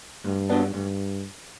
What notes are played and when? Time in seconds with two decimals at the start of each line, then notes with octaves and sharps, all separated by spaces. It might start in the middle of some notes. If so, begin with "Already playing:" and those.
0.25 D2 G2
0.50 D3 F#3 B3 D4
0.74 D2 G2